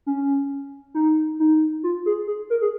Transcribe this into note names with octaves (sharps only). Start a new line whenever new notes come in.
C#4
D#4
D#4
F4
G#4
G#4
A#4
G#4